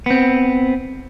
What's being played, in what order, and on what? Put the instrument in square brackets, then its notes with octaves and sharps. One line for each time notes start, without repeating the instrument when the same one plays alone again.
[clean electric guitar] B3 C4